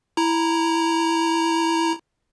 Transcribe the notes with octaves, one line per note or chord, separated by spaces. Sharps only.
E4 A#5